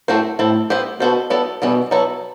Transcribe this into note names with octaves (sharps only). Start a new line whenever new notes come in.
A2 A3 C4 F#4 C5
A2 C4 E4 A4
B3 E4 G4 C5
B2 B3 F#4 A4 C5
B3 E4 A4 D5
B2 E3 G3 B3
F#3 B3 E4 A4